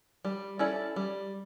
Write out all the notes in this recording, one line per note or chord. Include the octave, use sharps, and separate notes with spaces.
G3
C#4 E4 A4 D5
G3